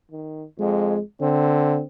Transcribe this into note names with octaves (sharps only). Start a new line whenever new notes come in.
D#3
F2 G#3
D3 C4